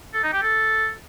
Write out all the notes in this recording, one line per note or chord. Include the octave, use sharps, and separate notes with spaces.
A4
D#4
G4
A4